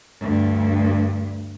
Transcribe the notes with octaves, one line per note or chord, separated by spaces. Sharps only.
D2 G2